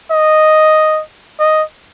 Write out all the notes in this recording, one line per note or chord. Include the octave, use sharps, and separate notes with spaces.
D#5
D#5